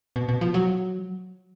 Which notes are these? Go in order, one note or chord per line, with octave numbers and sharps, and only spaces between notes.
B2
B2
F3
F#3